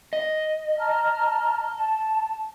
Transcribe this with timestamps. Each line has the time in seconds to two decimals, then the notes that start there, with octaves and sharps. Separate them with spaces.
0.13 D#5
0.77 A5 A#5 F6
1.75 A5